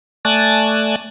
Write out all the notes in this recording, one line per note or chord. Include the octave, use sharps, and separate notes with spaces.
A3 D5 G#5 A5 F#6